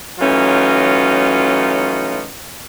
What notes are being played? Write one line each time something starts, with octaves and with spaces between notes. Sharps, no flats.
E3 F#3 A3 C#4 D#4 F4